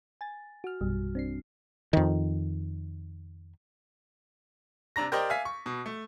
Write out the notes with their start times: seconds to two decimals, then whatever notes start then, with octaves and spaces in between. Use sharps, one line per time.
0.21 G#5 A6
0.64 F#4 F6
0.81 A#1 F#2 B2 G3
1.15 C4 D4 C7
1.93 F2 D#3
4.96 C3 D4 A#5 A#6
5.12 G4 A#4 C5 D5 D#5 G5
5.30 E5 F5 G#5 B6
5.45 C#6
5.66 B2
5.86 A3